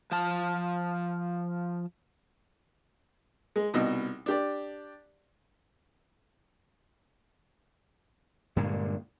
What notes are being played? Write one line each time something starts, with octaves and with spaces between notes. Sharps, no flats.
F3 A5
G#3
C2 B2 D#4
D4 G4 D5
G2 A#2 D3 G#3